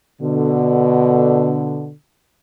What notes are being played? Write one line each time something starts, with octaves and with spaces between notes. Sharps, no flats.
B2 D3